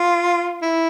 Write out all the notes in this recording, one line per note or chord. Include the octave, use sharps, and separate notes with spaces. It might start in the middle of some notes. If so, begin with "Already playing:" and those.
Already playing: F4
E4